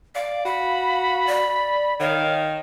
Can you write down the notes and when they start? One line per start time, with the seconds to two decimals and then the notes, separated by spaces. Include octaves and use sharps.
0.15 D5 F5
0.45 F#4 F5 B5
1.27 D5
2.00 D#3 C#5 F5